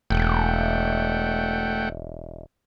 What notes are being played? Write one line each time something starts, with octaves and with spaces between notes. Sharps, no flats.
E1 A3 F#5 G5